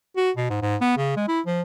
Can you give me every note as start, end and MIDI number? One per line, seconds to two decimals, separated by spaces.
0.17 0.31 66
0.37 0.48 47
0.50 0.60 44
0.62 0.76 44
0.81 0.93 59
0.97 1.15 49
1.16 1.27 56
1.28 1.40 64
1.46 1.62 53